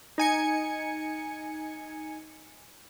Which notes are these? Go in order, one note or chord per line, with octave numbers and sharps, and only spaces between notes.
D#4 G#5 C#7